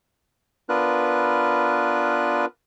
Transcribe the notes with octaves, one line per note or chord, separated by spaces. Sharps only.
B3 D4 F4 A#4 B4 F#6